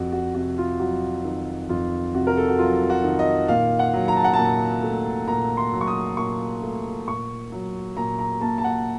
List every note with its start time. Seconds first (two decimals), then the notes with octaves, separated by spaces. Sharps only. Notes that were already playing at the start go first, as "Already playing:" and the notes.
Already playing: F2 F#4
0.12 F#4
0.35 C3 F#4
0.58 F4
0.79 F#3 F#4
1.24 D#3
1.69 F2 F4
2.15 C3 F#4
2.27 A#4
2.37 A4
2.48 F#4
2.59 F#3 F4
2.90 F#4
3.04 D#3
3.19 D#5
3.48 A#2 F5
3.79 F#5
3.93 F#3
4.08 A#5
4.17 A5
4.24 F#5
4.33 A#2 A5
4.83 A3
5.28 A#2 A#5
5.57 C6
5.73 F#3
5.81 C#6
5.87 D#6
6.17 A#2 C#6
6.62 A3
7.08 A#2 C#6
7.52 F#3
7.97 A#2 A#5
8.19 A#5
8.41 A#3 A5
8.58 A5
8.64 F#5